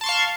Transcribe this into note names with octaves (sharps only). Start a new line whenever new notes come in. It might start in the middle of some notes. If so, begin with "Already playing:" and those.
F5 A5 C6 C#6